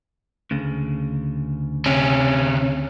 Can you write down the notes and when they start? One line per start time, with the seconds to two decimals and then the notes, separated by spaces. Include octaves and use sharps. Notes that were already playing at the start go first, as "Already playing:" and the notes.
0.51 D2 C#3
1.86 C3 C#4